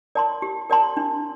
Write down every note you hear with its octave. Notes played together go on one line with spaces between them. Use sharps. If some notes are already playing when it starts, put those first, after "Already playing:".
A#4 D5 A5 C6
G4
A#4 D5 A5 C6
D4